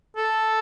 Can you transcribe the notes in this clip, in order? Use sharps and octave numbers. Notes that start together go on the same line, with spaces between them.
A4